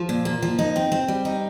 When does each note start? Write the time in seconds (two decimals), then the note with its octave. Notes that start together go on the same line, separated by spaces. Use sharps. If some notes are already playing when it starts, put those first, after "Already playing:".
Already playing: F3
0.09 A#2
0.25 A#3
0.43 F3
0.59 D#4
0.76 C4
0.92 C4
1.08 G3
1.25 D#4